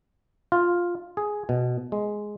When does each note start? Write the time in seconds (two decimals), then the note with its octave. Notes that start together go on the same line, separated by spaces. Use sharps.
0.52 F4
1.17 G#4
1.49 B2
1.92 G#3